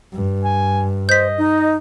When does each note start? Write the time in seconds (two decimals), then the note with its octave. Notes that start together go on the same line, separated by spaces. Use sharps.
0.13 G2
0.44 G#5
1.09 C5 D#5 G6 B6
1.38 D#4